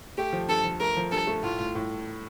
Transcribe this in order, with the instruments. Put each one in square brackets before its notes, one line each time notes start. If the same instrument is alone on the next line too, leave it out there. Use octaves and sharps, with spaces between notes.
[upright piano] A3 [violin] G4
[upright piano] F3
[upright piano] G2 [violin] A4
[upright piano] F3
[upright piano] A3 [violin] A#4
[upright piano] F3
[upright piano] G2 [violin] A4
[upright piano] A3
[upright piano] A2 [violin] F4
[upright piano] A2
A2